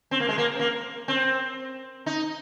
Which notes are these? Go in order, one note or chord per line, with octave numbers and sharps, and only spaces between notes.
C4
A#3
G#3
A#3
C4
A#3
C4
D#4